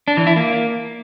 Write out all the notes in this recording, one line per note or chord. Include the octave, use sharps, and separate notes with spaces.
D4
E3
E4
A#3